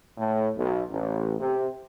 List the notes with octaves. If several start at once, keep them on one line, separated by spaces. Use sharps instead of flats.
A2
B1
A1
C3